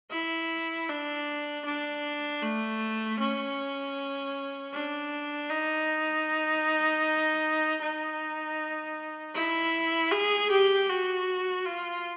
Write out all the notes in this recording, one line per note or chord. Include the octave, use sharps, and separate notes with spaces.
E4
D4
D4
A3
C#4
D4
D#4
D#4
E4
G#4
G4
F#4
F4